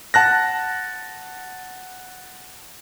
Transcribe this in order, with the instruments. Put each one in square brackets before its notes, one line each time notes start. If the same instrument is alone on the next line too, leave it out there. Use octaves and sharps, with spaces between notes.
[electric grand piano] F#5 A5 F#6 A#6